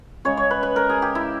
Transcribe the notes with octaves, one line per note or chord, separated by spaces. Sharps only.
C#3 G#3 C#5
C#5
B4
B4
A#4
G#4
G4
E4